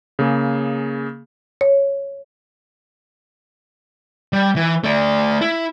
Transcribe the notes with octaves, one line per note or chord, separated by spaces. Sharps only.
C#3 A#3 G#4
C#5
G3
E3
A3 D5
E4